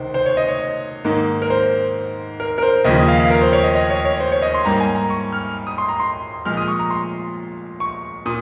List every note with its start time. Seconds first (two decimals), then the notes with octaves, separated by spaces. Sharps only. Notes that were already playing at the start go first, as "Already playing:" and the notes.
Already playing: C#2 C3 D#3 C5
0.14 C5
0.26 C#5
0.37 D#5
0.48 C#5
1.04 G#2 D#3 A#3
1.42 A#4
1.50 C5
2.40 A#4
2.58 A#4
2.62 C5
2.85 D#2 C#3 F3 A#3 D#5
2.96 D#5
3.08 F5
3.19 F5
3.30 A#4
3.41 C5
3.53 C#5
3.64 D#5
3.75 D#5
3.90 C#5
4.05 C#5
4.20 C5
4.32 C#5
4.42 D#5
4.54 C6
4.65 G#2 G3 A#3 A#5
4.80 G#5
4.95 A#5
5.10 C#6
5.33 F6
5.67 D#6
5.78 C6
5.88 A#5
6.00 C6
6.45 A#2 F3 G#3 F6
6.57 D#6
6.68 C#6
6.79 A#5
6.90 C6
7.80 C#6
8.26 A#2 D#6